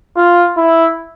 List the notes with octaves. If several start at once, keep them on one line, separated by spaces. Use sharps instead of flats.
F4
E4